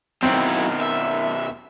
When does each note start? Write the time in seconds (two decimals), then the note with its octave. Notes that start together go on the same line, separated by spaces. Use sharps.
0.23 B2 D#3 F#3 C4 E4 F#4
0.81 E5